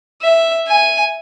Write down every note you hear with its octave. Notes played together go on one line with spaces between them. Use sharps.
E5
G#5